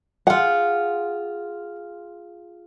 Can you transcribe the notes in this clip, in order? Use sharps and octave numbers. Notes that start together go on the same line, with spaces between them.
F4 G#4 F#5